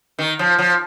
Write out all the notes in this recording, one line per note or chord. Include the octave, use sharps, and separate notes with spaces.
D#3
F3
F3